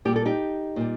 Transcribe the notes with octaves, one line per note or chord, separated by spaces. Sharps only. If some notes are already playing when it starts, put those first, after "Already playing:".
A#2 G3 G4
A4
D#4 G4
A#2 G3